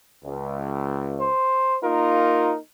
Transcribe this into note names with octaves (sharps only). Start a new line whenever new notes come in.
C#2
C5
A#3 D#4 F4 A#4